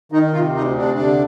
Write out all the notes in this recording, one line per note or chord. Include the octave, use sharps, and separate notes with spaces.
D#3 D#4
C3 F4
D2 D#4
C3 D4
D3